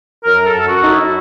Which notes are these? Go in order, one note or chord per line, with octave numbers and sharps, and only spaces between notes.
F#2 A#4
F#2 A4
F#2 F#4
D#4
F#2 E4